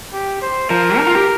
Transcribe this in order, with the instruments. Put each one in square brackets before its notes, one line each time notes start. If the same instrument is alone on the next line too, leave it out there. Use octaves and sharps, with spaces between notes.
[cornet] G4
C5
[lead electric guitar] F3 [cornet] A#4
[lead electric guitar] D#4
F4
G4